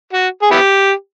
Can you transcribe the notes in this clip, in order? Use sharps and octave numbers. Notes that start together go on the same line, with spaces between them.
F#4
G#4
B3 E4 G4